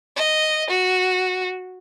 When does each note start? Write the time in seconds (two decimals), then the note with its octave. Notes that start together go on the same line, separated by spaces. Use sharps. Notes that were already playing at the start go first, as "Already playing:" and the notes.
0.16 D#5
0.70 F#4